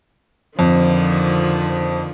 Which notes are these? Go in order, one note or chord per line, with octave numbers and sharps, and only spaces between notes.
F2 D3 D#3 F3